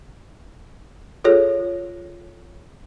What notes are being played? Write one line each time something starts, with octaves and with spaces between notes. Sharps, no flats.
F4 G#4 A4 C#5